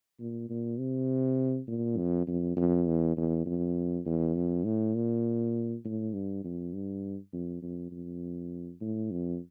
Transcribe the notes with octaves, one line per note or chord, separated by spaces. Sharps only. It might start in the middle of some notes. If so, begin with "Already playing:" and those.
A#2
A#2
C3
A#2
F2
F2
F2
E2
E2
F2
E2
F2
A2
A#2
A2
G2
F2
G2
F2
F2
F2
A2
F2